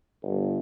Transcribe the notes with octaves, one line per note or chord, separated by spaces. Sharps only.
G1